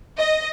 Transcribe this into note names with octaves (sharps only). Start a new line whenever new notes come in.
D#5